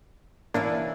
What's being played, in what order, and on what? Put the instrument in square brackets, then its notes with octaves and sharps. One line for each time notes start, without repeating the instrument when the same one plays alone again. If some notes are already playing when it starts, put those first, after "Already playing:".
[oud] E3 C#4 E4 [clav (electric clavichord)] A#3 D4